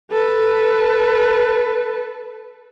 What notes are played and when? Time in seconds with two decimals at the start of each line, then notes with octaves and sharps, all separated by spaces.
0.12 A4 B4